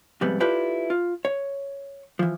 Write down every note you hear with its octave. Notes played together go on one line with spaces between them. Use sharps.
F2 G#2 C3 G3 B3
E4 F4 G4 A4 B4 D5
F4
C#5
E3 F3